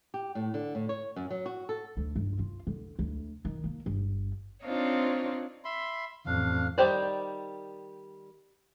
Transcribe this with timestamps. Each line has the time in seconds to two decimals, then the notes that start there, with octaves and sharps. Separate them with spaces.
0.14 G4
0.35 A2
0.54 D3
0.75 A2
0.89 C#5
1.16 F#2
1.30 F#3
1.46 F#4
1.69 A4
1.97 D2
2.16 G1
2.39 F4
2.67 D3
2.99 D2
3.45 D#3
3.64 A#3
3.86 G1
4.63 C4 D4 D#4 F4 C5 C#5
5.65 E5 B5 C6
6.26 A1 F2 D4 F5
6.78 D#3 G3 G4 C5 D5